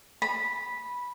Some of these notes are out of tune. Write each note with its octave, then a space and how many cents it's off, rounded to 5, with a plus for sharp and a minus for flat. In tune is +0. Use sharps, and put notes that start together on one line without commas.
B5 -10